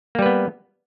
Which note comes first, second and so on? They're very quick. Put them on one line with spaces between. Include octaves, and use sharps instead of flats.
A#3 G3 B4 B3